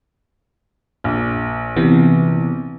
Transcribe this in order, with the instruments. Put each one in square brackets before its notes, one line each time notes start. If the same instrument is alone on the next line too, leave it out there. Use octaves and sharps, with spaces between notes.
[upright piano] A#1
[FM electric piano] C3 E3 B3